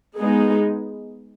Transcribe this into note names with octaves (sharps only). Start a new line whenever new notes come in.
G#3 B3 D#4 G#4